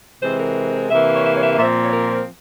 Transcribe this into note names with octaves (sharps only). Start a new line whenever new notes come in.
C3 E3 G#3 C4 C5
A#4
C3 E3 A#3 E5
C#5
E5
C#5
E5
A#2 F3 C4 E5
C#5
A#4